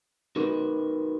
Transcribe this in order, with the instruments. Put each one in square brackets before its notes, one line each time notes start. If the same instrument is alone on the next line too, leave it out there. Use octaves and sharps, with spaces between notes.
[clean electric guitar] D#4 F#4 A#4 B4